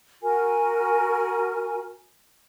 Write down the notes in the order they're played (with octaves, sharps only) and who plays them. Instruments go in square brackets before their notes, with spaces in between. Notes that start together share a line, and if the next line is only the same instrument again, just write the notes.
[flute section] F#4 A#4 G#5